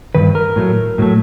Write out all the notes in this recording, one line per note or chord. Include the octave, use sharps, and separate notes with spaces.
G2 D#3 B4
A#4
A2 F#3 A3
A2 F#3 A3